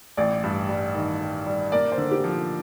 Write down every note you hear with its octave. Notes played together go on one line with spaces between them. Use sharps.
A1 D5
G2
G3
D#3
G3
G3
A#3 D5
C5
D3
G4
F3